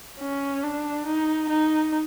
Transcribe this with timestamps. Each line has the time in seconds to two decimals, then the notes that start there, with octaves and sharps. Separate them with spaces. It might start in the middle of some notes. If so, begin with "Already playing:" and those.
0.20 C#4
0.63 D4
1.06 D#4
1.49 D#4